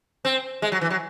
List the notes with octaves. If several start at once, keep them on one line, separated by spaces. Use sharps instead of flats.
C4
G#3
F#3
E3
F#3